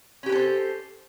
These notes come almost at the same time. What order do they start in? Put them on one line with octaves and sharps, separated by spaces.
C#4 G4 B4 A4 C5